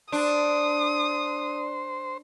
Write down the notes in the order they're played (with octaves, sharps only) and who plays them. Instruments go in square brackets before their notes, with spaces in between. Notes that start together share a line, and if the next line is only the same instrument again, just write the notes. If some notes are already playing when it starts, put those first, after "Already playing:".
[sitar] D4 [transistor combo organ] C5 [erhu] D#6